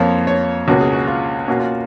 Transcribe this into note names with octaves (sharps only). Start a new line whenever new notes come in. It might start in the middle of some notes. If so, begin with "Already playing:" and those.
Already playing: F2 F3 A#3 C#5
C#5
C#2 B2 A#3 C#4 F#4
G#4
F#4
F4
B2 A#3 C#4 F#4
F4